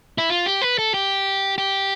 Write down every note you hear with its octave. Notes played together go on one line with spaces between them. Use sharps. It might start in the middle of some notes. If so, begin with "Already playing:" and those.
E4
F4
G4
B4
A4
G4
G4